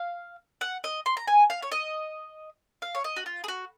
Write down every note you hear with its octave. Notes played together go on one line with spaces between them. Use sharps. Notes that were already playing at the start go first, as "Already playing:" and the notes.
Already playing: F5
F#5
D#5
C6
A#5
G#5
F5
C#5
D#5
F5
C#5
D#5
F#4
F4
G#4
F#4